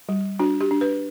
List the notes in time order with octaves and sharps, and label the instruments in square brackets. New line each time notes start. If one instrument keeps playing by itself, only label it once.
[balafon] G3
D4 F#4
G4
D4
B4